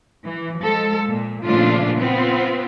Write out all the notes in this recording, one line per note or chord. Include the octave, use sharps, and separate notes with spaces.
E3
F3 G#3 A4
A#2
A#2 C#3 F3 A3 D4 F4
B3 C4 F4